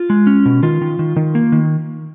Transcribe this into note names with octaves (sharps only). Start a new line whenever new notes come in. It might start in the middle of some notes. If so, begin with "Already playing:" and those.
Already playing: F4
G#3
C#4
B2
D#3 F4
D#3
D#3
D#3
A#3
D#3